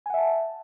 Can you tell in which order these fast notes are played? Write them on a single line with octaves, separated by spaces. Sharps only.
G#5 F#5 E5 A5